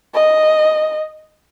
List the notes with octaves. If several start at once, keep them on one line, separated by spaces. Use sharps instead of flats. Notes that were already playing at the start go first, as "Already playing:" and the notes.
D#5